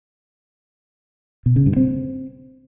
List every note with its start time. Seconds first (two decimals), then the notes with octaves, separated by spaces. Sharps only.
1.46 B2
1.56 C#3
1.66 G2
1.76 C4